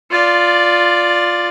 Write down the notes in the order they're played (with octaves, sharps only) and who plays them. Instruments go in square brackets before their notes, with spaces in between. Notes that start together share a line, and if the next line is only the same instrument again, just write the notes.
[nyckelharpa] F4 D5